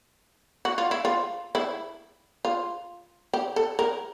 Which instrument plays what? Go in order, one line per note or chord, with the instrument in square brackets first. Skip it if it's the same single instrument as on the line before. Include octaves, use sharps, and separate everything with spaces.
[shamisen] F#4
F4
E4
F4
E4
F4
G4
A4
A#4